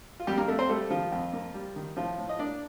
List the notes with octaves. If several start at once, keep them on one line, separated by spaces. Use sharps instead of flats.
F4
F2 G3 G4
A#3 A#4
A3 A#3 A4
C4 C5
G3 A3 A4
D#3 F3 F4
F2
A#3
G3
D#3
A2 F3 F4
A2
D#5
A#3 D4 D5